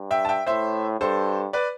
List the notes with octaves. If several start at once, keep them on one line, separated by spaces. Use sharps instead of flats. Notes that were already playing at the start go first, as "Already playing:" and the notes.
Already playing: G2
E5 G5
A5
E5 G5
A2 C5 E5
G2 A4 C5
B4 D5